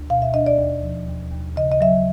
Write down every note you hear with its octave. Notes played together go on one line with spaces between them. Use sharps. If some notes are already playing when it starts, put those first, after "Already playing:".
Already playing: D2
B2 F5
E5
D4 D#5
D5
D#2
F3
D#2
D#2
C#3 D#5
D#5
F#3 E5